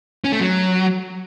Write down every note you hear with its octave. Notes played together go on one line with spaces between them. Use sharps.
C#4
A3
F#3